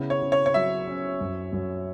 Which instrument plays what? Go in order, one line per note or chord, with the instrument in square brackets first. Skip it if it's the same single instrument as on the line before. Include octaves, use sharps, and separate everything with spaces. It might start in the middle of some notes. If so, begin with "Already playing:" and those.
Already playing: [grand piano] C#3 B3 E4
[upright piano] C#5
[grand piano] C#3
[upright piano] C#5
C#5
[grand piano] F#3 [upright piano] E5
[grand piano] C#4
F#2
F#2